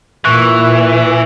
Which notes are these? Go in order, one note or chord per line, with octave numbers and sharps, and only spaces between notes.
A#2 E3 C#6 F#6